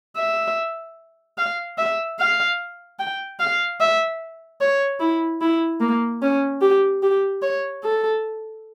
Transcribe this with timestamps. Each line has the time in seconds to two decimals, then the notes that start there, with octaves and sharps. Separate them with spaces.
0.16 E5
1.38 F5
1.78 E5
2.19 F5
2.99 G5
3.40 F5
3.80 E5
4.61 C#5
5.00 E4
5.41 E4
5.81 A#3
6.22 C#4
6.61 G4
7.03 G4
7.42 C#5
7.83 A4